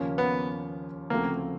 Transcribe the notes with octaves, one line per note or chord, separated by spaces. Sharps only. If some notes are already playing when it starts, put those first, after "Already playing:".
Already playing: D#2 C#3 F3 A#3 C#4
B3
D2 C#3 F3 A3 A#3 C4